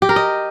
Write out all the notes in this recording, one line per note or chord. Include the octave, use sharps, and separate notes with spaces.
G4
A#4
D#5